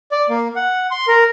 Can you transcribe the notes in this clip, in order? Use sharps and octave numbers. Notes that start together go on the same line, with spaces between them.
D5
A#3
F#5
C6
A#4